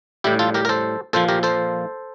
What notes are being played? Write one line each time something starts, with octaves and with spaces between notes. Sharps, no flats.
A2 G3 E4 G4
F4 A4
G4 A#4
A#4
A4 C5
A#2 F3 A4 C5
G4 A#4
A4 C5